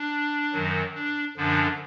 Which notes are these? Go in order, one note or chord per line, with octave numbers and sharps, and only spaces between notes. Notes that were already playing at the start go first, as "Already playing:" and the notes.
Already playing: D4
F#2 D#3 F#3
D4
F#2 D3 F3 D4